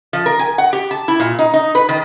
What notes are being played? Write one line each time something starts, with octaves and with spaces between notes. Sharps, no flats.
F3
A#4
G#5
F#5
G4
A5
E4
A#2
D#4
D#4
B4
D#3